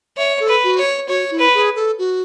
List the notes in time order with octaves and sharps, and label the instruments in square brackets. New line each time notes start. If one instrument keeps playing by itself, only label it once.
[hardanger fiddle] C#5 [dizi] E5
[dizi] A4
[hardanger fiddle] B4
[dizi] F#4
[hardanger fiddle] C#5
[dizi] F#4 [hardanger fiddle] C#5
[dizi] E4
[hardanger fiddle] B4
[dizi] G#4
A4
F#4